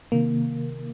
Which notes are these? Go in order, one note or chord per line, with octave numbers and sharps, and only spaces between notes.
C3 D#3 A#3